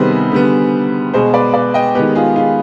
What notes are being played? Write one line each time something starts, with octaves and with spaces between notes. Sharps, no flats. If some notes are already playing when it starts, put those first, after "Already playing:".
Already playing: C3 D#3 G3 B3 G#4 B4 C5
D3 G3 B3
B2 G#3 B3 G#4 C5
B4 D5
B4 D5
D#5 G5
D#3 G#3 B3 G4 B4
F4 G#4
F4 G#4